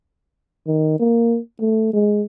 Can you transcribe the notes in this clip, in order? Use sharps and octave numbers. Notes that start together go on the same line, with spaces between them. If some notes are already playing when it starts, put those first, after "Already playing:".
D#3
A#3
A3
G#3